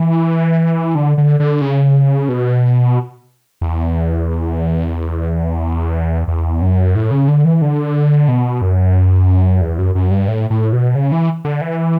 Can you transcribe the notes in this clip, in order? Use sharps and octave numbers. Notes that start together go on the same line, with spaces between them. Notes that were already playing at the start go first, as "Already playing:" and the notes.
Already playing: E3
D3
D3
D3
C#3
B2
E2
E2
F#2
A2
C#3
D3
E3
D3
B2
F#2
E2
F#2
F#2
G2
A2
A2
B2
C#3
E3
D3
E3